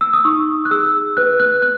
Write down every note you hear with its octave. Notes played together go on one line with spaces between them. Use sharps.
E6
D#6
D#4 C#6
F#6
G#4 E6
B4 F#6
F#6
F#6